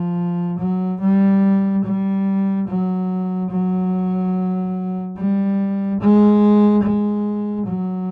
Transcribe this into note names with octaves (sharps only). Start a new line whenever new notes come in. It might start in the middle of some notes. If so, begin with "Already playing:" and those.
Already playing: F3
F#3
G3
G3
F#3
F#3
G3
G#3
G#3
F#3